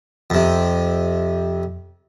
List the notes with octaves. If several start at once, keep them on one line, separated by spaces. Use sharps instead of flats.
F2 C3